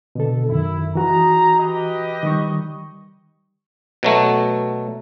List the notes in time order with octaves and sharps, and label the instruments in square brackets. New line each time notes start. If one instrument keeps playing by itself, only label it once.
[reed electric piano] B2 D3 A4
[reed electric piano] F#2 D#3 [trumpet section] E4
[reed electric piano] E3 F#4 [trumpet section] D#4 G#4 A#5
[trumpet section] G4 B4 D#5
[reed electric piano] D#3 G3 C#6
[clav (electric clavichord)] B2 F#3 A3